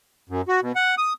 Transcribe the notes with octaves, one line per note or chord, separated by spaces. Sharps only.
F#2
F#4
B2
F#5
D#6